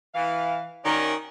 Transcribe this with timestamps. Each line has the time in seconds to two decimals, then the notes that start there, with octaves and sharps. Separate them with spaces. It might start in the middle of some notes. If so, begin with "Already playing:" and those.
0.14 E3 F5
0.85 D#3 C#4 F#4 A#4 C#5 D5